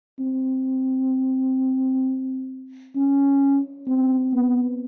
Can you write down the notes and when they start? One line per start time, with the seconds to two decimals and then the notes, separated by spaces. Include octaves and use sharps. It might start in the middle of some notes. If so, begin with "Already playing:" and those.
0.20 C4
2.96 C#4
3.87 C4
4.34 B3